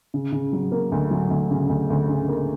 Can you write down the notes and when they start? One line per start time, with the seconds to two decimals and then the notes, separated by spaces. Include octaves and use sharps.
0.14 C#3
0.32 C#3
0.53 F#3
0.72 A#3
0.92 D2
1.11 F#3
1.31 D2
1.51 C#3
1.70 D2
1.90 D2
2.09 C#3
2.28 A#3